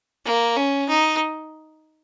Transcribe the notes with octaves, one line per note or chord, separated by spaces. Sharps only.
A#3
C#4
D#4